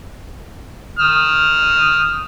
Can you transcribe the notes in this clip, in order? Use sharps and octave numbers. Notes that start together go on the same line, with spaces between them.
D#6 F6